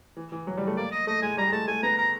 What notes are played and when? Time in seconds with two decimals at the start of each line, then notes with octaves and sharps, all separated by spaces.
0.17 E3
0.32 E3
0.47 F#3
0.57 G3
0.67 A3
0.77 A#3 D5
0.92 D#5
1.07 A3 D#5
1.22 G#3 G#5
1.37 G3 A#5
1.47 G#3
1.52 A3 A5
1.68 A3 G#5
1.83 B3 A#5
1.98 A#5